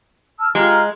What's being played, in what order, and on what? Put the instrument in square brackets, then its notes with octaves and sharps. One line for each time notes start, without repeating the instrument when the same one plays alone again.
[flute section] A5 E6 F6
[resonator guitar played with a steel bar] G#3 [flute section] F4 G4 A#5